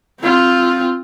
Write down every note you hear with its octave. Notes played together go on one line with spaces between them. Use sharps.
C4 F4